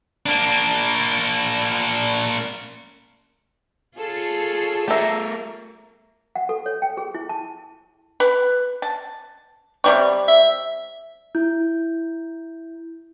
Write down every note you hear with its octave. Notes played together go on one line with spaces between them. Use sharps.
A#3 D4
F4 G#4 A4 C#5
A3 G4 A#4 E5
F#5
A4
C#5
G5
G#4
E4
A5
B4
A5
C3 G3 C#6
E5
E4 G6